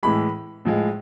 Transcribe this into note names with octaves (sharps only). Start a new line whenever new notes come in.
A2 E3 G#3 B5
A2 F3 G#3